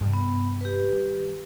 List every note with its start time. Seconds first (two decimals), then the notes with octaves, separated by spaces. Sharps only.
0.01 G2 C3
0.14 B3
0.61 G4 B4
0.88 D#3 G3